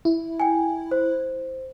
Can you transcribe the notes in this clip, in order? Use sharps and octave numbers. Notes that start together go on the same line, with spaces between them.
E4
G5 G#5
C5